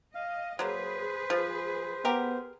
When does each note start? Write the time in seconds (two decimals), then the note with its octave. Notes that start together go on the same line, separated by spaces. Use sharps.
0.15 D#5 F5
0.59 F#3 A#3 G#4 B4 C5
1.30 F3
2.05 B3 G4 A#4